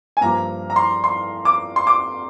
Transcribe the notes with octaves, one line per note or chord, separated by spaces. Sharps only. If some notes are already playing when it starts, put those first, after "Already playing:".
G#5
G2 F3 A#3 A#5
A#5
C6
C6
D6
C6
D6